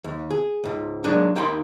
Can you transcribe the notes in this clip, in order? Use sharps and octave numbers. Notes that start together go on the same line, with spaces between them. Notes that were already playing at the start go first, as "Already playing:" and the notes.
D#2
G#4
C#2 G#2
F#3 G#3 A#3 D4 D#4
D#2 A#3 D#4 G5 B5 C6